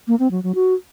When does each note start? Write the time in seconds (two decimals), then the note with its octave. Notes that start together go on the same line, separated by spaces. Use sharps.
0.08 A#3
0.19 C4
0.31 F#3
0.43 F#3
0.55 F#4